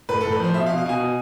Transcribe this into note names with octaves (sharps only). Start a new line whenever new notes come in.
A2 B4
A2 A4
B4
F3 C5
B2 E5
F5
B2
F5
B2 G#5
B2